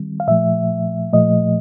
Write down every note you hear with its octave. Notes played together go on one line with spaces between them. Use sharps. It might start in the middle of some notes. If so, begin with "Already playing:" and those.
Already playing: D#3 G3 C4
F5
A#2 F3 A3 E5
A#2 F3 A3 D#5